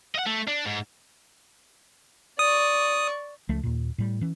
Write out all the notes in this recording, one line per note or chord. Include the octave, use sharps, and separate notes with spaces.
D#5 F#5
A3
D4
G#2
D5 C#6 D#6
C#2 F3 A3
D#2 A#2
A2 G3
E3 C#4